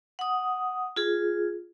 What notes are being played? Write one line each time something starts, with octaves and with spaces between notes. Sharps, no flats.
F#5 D#6
F4 G#4